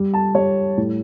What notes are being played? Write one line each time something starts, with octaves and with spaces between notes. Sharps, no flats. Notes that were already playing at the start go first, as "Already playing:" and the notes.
Already playing: G3
A5
G3 C#5
A2